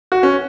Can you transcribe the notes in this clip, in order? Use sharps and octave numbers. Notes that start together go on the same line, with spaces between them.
F#4
C#4